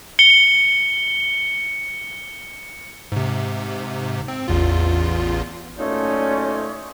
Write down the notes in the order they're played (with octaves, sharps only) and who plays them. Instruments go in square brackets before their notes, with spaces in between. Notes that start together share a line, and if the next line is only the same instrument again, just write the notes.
[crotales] C#7 G7
[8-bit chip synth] G#2 C3
C4
A1 E2 F4
[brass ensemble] F#1 C#4 D5 [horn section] A3 D#4 F4 [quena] C#5